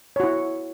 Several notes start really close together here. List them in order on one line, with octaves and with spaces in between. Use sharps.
C#5 F#4 E4